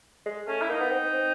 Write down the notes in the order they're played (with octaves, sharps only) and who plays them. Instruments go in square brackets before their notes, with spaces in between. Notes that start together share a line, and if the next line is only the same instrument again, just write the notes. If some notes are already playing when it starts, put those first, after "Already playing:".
[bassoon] G#3
[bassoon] A3 [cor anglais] C#4
[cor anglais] E4
[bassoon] A#3 [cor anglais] D#4
[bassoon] B3
C4
C4